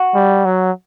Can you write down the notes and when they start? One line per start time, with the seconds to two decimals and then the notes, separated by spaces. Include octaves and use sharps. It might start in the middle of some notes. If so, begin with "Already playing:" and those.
Already playing: F#4
0.15 G3
0.45 F#3